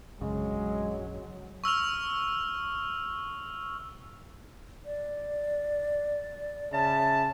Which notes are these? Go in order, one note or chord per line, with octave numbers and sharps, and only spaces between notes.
A#1 F#2 C#3 F#3 G#3
C#6 E6 F6 F7
D5
C#3 E5 A5